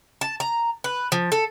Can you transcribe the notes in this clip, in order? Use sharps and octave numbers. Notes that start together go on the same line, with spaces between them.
A5
A#5
B4
F3
A4